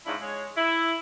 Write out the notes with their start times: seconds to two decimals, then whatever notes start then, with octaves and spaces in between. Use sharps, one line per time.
0.06 G#2 F3 C#4 D4 E4
0.21 G#3 C#5
0.56 E4